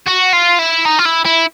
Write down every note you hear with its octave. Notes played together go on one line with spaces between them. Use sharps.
F#4
F4
E4
D#4
F4
E4
E4